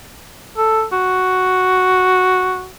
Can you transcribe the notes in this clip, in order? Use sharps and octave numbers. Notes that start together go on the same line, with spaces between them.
A4
F#4